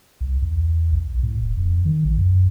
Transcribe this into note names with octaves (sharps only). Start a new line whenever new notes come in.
C2
E2
B1
A2
D#1
F2
D#3
A#1
F#2